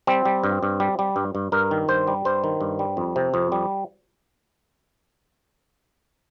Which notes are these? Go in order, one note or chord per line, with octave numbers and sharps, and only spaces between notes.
G3 C4
G3
G2
G2
G3
G3
G2
G2
G2 A#4
D#3
G2 C5
G3
G2 C5
D#3
G2
G3
F2
C3
F2
G3